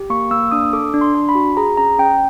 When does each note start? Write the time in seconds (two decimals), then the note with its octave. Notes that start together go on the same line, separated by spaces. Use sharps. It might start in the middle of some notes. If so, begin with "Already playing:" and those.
Already playing: G4
0.10 A#3 C#6
0.31 A#3 E6
0.51 D4 D#6
0.73 A4 D6
0.94 D4
1.01 C6
1.15 D4
1.29 B5
1.35 F#4
1.57 G#4 A#5
1.77 C#4 A#5
1.98 C#4 G5